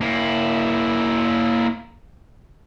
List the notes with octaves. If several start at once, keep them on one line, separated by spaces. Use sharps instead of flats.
A#3 E4